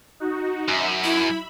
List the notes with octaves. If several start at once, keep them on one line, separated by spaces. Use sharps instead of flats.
D#4 F#4
F#2 E5 B5
E4